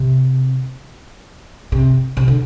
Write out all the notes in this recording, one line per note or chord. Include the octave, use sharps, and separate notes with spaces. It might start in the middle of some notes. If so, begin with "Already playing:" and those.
Already playing: C3
C3
C3
D3